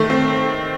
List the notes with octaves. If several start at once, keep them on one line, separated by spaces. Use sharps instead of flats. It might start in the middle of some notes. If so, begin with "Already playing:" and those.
Already playing: D#3 A3
C4